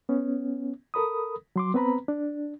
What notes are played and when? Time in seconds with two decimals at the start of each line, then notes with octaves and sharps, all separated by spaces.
0.09 B3 C#4
0.94 A4 A#4 B5 D#6
1.56 F#3 C6 D6
1.74 B3 C4 B4 A#5 B5
2.08 D4